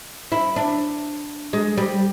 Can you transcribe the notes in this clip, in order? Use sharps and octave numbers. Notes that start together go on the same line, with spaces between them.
E4
D4
G#3
G3